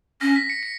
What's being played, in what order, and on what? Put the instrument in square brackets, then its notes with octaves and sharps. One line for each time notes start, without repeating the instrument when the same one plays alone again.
[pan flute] C#4 [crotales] A#6
[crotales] B6
C#7
C#7